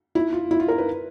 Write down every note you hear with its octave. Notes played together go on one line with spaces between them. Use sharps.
E4
F4
E4
F4
A#4
B4